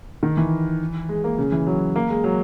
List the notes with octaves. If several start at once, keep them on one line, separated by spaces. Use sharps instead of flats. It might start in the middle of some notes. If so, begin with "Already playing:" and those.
D#3
E3
G#3
A#3
C#3
E3
F#3
A#3
G#3
F#3